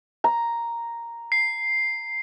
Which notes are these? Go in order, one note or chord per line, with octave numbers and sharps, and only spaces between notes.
A#5
C7